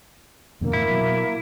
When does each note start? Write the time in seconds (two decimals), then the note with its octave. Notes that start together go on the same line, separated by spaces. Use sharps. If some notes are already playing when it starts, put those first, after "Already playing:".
0.61 F2 B2 D3 A#3
0.73 A2 E3 E4
0.90 B2 F#3